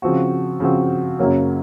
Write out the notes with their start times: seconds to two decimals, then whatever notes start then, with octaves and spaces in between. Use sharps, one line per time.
0.02 C#3 F3 C4 F#4
0.60 C#3 F3 C4 F#4
1.19 F#2 C#3 F#3 A#3 C#4